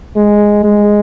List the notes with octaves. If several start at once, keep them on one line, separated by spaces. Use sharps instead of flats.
G#3
G#3